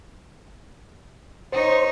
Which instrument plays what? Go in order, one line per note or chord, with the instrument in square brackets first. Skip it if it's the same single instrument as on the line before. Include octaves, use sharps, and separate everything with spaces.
[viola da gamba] D#4 C#5 [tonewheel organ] C5